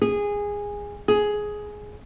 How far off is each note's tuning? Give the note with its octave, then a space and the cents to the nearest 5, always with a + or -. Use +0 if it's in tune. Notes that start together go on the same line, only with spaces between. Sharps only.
G#4 -15
G#4 +10